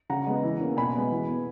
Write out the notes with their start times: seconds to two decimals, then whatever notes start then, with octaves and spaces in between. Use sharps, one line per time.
0.09 C#3 F#5 A#5
0.27 G#3 B3
0.43 E3
0.60 A#3 C#4
0.77 B2 G#5 B5
0.95 G#3 B3
1.11 E3
1.28 B3